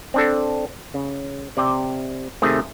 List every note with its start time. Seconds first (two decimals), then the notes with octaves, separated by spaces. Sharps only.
0.14 C4 D4 A4
0.94 C#3
1.57 C3 D5 G5
2.42 C3 D#3 A3 G#4